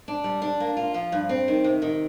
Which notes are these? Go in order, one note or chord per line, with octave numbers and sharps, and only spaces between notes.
D4
G3
D4
A#3
F4
F3
G2
C4
D#3
C3
D#3